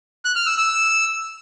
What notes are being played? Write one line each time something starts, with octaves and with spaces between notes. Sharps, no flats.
F#6
F6
E6
E6